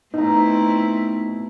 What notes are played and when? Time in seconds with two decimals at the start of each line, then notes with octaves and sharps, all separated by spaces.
0.14 B2 A3 C4 D#4 E4 A#5